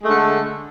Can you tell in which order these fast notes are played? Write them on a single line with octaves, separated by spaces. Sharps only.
G#3 A3 D3